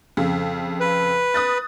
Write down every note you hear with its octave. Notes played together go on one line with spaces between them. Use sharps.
F2 C#3
B4
D#6 F#6 A6